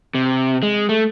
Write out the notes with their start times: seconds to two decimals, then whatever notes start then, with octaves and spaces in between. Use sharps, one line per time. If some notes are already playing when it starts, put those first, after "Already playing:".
0.14 C3
0.63 G#3
0.89 A3